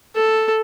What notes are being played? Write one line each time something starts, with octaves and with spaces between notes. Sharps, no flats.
A4